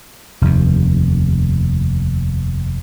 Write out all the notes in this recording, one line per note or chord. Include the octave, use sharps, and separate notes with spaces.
F1 D#2